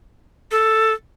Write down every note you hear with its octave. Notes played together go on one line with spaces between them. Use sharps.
A4